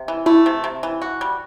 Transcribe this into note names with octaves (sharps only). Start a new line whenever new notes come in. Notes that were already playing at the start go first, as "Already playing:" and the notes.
Already playing: C3
E3
A3 E4
C3
C3
E3
F#4
G3